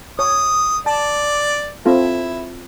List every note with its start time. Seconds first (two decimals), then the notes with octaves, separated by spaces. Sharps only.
0.19 C#5 D#6
0.86 D5 A5
1.86 C4 E4 F4 A4